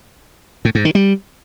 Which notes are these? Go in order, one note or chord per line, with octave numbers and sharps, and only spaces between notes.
A2
G#2
D#3
G3